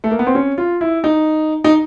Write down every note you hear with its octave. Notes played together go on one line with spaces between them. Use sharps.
A3
A#3
B3
C4
C#4
F4
E4
D#4
D#4